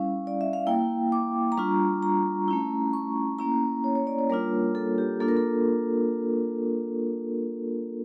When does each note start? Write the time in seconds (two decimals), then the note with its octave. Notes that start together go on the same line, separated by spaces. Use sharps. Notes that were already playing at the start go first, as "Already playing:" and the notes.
Already playing: G3 C#4 E4 F5
0.27 D5
0.41 E5
0.53 F5
0.67 A#3 E4 G5
1.12 D6
1.52 A#5
1.58 G3 D4 F4 C#6
2.03 A#5
2.48 A3 C#4 E4
2.93 C#6
3.39 A#3 C#4 E4 A#5
3.84 C#5
3.95 C#5
4.07 D5
4.19 C#5
4.30 G3 A#3 D4 F4 A#4
4.75 A4
4.98 G4
5.20 A#3 D4 F4 A4
5.28 A#4
5.37 A4